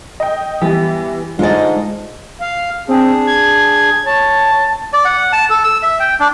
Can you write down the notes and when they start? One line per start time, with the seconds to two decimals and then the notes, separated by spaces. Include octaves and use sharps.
0.20 D#5 G5
0.62 E3 G3 B3 G4
1.39 G#2 D3 G#3 F4 A4 D5 D#5
2.41 F5
2.88 C4 D4 G#4
3.27 G#6
4.06 C#5 A5
4.93 D5
5.05 F#5
5.33 A5
5.50 A4
5.64 E6
5.83 E5
6.00 G5
6.20 D4